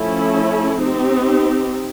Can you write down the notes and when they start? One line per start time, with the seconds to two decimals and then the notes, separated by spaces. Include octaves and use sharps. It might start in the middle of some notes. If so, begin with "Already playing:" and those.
Already playing: F3 A3 C#4 E4 A4
0.81 C4 D#4 G4